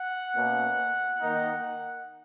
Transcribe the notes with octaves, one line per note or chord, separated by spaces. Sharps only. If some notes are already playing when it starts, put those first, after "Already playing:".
Already playing: F#5
B2 A#3 C#4
D#3 A#3 D#4